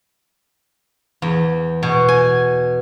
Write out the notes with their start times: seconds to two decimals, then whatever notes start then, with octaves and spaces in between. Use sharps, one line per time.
1.22 E2
1.83 B2
2.08 G#5